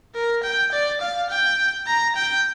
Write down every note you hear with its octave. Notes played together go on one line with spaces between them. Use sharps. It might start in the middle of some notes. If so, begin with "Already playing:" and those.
A#4
G5
D5
F5
G5
A#5
G5